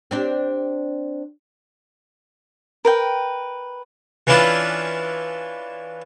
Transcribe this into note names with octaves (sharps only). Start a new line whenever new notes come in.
C4 D4 G4
A#4 B4 G5
E3 C#4 D4 E4 F4